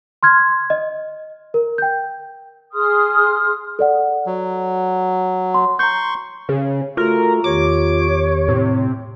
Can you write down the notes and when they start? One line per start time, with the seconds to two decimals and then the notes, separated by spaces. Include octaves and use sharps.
0.23 C6 F6 G#6
0.70 D#5
1.54 A#4
1.78 G5 G6
2.72 G#4 C6 D#6 F6
3.79 A4 D5 F#5
4.26 F#3
5.54 C6
5.79 A#5 C6 C#6 G6
6.49 C#3
6.97 A3 F4 F#4 A4 A#4
7.44 E2 D#3 G4 C#5 D6
8.48 A2 C3